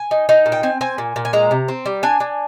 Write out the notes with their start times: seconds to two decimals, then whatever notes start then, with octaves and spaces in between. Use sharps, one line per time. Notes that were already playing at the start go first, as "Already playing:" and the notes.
Already playing: G#5
0.11 D#4
0.29 D#4
0.46 A#2
0.52 G5
0.63 C4 G#5
0.81 C4 G#5
0.98 A#2
1.16 A#2
1.25 G#5
1.33 G#3 A#5
1.51 C3
1.68 C4
1.86 G3
2.03 D4 G#5
2.20 D4